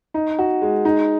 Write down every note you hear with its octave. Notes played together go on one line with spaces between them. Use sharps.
D#4
F#4
G#3
D#4